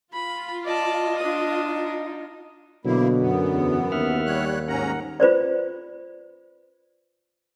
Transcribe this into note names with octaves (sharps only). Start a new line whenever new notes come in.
F4 B5
D5 D#5 A5
D4 D#6
D#4
B2 D3 F#3 A#3 E4
F#2 B3
E2
D#2 E5 F#5 F6
G3 C#5 F#6
G#2 C#4 A#4 F#5 A#5
F4 B4 C5 D5